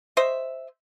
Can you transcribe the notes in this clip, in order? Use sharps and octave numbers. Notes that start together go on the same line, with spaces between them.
C5 D#5 E5